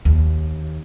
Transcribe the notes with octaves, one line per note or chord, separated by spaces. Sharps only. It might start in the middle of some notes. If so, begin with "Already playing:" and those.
D#2